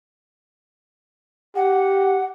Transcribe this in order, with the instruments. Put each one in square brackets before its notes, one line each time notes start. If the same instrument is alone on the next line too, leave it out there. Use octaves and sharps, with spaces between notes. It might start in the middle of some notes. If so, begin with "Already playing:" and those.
[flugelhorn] G4 [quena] F#5